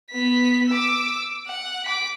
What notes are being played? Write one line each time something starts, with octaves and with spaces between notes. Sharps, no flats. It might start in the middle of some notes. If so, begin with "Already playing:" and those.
B3 B6
D6 E6
F#5
D6 B6